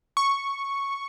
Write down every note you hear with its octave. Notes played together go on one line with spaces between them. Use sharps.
C#6